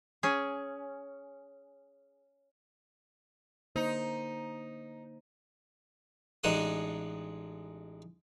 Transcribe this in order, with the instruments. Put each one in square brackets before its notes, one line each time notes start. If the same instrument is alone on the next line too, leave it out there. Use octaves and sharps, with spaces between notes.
[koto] C#4 G#4
[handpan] D3 A#3 C5 [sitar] D#4
[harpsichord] A1 G#3 D4 D#4 F#5 D#6